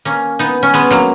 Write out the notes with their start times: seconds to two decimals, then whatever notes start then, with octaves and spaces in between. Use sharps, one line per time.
0.05 A#3 C#4
0.39 B3 D#4
0.63 C#4
0.74 G#3 B3
0.90 F#3 A#3